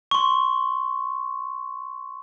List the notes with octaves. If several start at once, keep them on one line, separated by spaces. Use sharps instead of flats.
C6 C#6